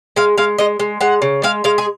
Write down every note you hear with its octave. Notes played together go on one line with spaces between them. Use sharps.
G#3 F5
G#3 F5
G#3 D#5
G#3
G#3 F#5
C#3
G#3 F5
G#3 F5
G#4